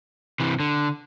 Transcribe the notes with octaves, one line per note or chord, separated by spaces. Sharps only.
C3 E3
D3